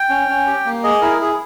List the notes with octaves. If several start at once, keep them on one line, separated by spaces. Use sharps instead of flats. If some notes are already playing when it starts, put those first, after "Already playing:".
Already playing: G5
C#4
C#4
G4
A#3
G#4 D#5
E4 A#4
G#4